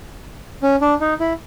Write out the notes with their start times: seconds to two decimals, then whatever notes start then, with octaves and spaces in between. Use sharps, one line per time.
0.63 C#4
0.81 D4
1.00 D#4
1.20 E4